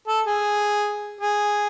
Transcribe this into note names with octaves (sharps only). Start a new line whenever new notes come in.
A4
G#4
G#4